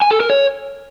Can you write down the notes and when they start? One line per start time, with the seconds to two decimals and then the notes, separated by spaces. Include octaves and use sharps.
0.02 G#5
0.11 A4
0.20 A#4
0.30 C#5